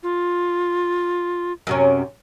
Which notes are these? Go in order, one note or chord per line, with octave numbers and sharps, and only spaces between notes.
F4
F#2 C3 C#4